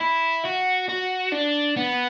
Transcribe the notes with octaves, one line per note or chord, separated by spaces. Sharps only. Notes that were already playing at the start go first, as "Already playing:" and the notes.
E4
F#4
F#4
D4
B3